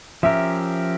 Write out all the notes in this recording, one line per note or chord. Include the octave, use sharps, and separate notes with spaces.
F3 C#4 G4 A#4 E5